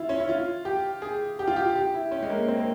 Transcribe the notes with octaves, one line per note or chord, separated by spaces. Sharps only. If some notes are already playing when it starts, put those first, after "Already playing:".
Already playing: E4 F4
C#4
E4
F4
G4
G#4
G4
F4
G4
G4
E4
C#4
G#3
A#3
C4
A#3